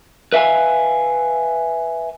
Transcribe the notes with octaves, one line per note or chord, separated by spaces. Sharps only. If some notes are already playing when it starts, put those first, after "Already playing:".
B4 E5 F5 G#5